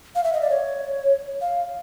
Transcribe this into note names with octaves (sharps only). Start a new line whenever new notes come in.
F5
E5
D#5
D5
C#5
F5